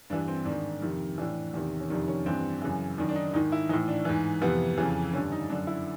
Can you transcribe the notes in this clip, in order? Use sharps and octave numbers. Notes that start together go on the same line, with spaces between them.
G2 E3 D4
C4
G#2 D#3 D4
F2 C3 D#3
A2 E3 D4
E2 C3 D#3
C#4
F2 C3 D#3 D4
C#4
G2 E3 C4
F#2 C#3 E3
F#2 D#3 D4
D4
D#4
G#2 D#3 D#4
E4
A2 E3 D#4
D4
G#2 E3
F2 C3 E3 B3
F2 C#3 E3
G2 D3 C#4
D#4
F#2 D3 D4
E4